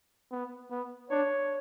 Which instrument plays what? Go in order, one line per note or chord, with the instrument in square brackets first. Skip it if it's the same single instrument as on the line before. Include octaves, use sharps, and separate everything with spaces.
[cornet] B3
B3
[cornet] D4 [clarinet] C#5